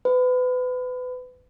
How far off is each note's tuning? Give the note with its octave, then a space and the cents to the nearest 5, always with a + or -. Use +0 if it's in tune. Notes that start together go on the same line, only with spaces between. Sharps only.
B4 +30